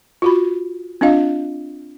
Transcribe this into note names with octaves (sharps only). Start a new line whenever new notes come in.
F4 F#4 B5
C4 D4 F4 D#5 F5